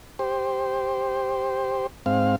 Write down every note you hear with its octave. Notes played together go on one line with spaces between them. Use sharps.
G4 C5
G#2 C4 F5